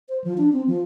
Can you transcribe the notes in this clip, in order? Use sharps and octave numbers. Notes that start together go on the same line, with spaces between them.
C5
F3
D4
C4
F3